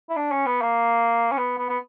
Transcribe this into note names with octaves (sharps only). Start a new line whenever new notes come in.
E4
D4
C#4
B3
A#3
C#4
B3
B3
B3